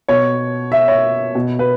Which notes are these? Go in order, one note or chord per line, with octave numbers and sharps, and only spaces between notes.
B2 C#5
E5
C#5
B2
B4